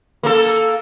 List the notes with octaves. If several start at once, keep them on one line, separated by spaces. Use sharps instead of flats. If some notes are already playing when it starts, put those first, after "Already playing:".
A#3 A4